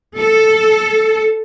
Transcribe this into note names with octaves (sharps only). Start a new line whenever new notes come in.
A4